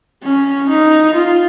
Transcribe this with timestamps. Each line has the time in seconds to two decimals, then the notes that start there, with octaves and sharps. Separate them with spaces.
0.23 C#4
0.68 D#4
1.15 F4